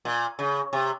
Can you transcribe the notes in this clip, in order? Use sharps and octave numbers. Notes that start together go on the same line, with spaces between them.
A#2
C#3
C3